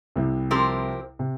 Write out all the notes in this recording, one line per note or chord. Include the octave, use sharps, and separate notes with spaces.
C2 C3
F3 C4 G4 A#4
C3